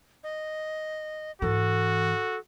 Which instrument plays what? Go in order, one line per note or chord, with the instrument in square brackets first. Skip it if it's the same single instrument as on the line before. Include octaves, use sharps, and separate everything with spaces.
[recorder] D#5
[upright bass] G#2 E3 [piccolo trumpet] F#4 [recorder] A4